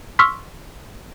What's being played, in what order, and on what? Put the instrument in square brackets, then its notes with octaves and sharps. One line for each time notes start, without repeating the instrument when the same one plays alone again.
[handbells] C6 C#6 E6 F6 B6